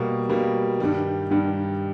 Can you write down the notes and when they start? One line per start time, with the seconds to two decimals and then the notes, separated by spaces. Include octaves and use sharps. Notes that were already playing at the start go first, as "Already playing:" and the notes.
Already playing: B2 G3 A#3
0.29 B2 G3 A#3
0.80 G2 D#3 G3
1.31 G2 D#3 G3